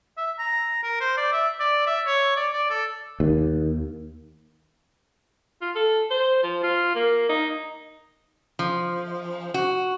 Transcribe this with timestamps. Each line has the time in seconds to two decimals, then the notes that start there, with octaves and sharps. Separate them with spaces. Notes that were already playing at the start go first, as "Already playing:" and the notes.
0.17 E5
0.39 A#5
0.83 A#4
1.01 C5
1.17 D5
1.32 E5
1.60 D5
1.86 E5
2.07 C#5
2.36 D5
2.53 D5
2.70 A4
3.20 D#2
5.62 F4
5.76 A4
6.11 C5
6.44 F3
6.64 F4
6.95 A#3
7.30 D#4
8.59 F3
9.54 F#4